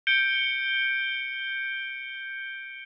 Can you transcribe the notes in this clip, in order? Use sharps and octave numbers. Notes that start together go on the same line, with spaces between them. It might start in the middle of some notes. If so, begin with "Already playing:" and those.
G6 C#7 D7 G7